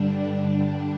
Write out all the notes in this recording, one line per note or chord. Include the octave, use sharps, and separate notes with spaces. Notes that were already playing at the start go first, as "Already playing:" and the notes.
Already playing: G2 D3 G3 D4
G2 D3 G3